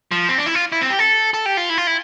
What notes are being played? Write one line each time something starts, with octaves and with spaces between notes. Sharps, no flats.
F3
C4
D4
E4
F4
E4
C4
G4
A4
A4
G4
F4
E4
F4
E4